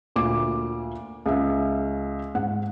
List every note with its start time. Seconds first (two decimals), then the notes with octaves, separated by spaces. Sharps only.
0.16 D2 A#2 D6
1.26 C#2 E5
2.35 G#2 F#5